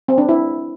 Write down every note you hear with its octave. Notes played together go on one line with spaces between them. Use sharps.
C4
D4
E4